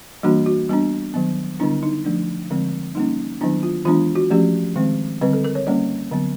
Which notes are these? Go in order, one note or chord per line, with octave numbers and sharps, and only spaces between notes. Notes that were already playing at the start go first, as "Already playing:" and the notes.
E3 G3 A#3 D4 F#4
F#4
G3 B3 D4
D#3 F#3 B3
D3 G3 B3 D4 E4
D#4
F3 A3 D4
D3 F3 G#3 C4
G3 A#3 C#4 D#4
D#3 F#3 B3 D4 E4
F4
E3 G#3 B3 D4 F4
F#4
F3 A3 C#4 G4
D#3 G#3 C4
D3 G3 C4 B4
A4
A#4
C#5
G3 A#3 C#4 D5
D3 F#3 B3